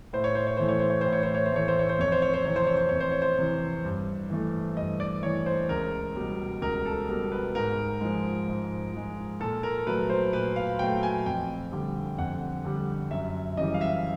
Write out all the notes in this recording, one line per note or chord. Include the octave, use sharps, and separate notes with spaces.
A2 C5
C#5
C5
C#5
E3 A3 C5
C#5
C5
C#5
C5
A2
C#5
C5
C#5
C5
E3 A3 C#5
C5
C#5
C5
F2 C#5
C5
C#5
C5
C3 E3 C#5
C5
C#5
C5
F2 C#5
C5
C#5
C5
C3 E3
G2
E3 A3
G2 D#5
D5
E3 A3 C#5
C5
C#2 A#4
B2 G3
C#2 A#4
A4
B2 G3 A#4
B4
G#2 A#4
F3 G#3
G#2
F3 G#3
A#2 A4
A#4
F#3 A3 B4
C5
A#2 B4
F5
F#3 A3 G5
G#5
F2 G5
D3 G3
F2 F#5
D3 G3
F#2 E5
C#3 E3 G3 D#5
F5
E5